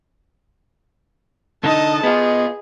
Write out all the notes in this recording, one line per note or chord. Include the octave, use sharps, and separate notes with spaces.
D3 D#4 D#5 A5
B3 F4 G#4 D#5